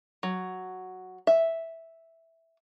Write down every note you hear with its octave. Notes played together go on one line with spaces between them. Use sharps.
F#3
E5